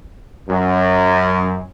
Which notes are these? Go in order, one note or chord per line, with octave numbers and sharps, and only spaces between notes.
F#2